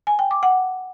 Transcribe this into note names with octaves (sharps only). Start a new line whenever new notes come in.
G#5
G5
D6
F#5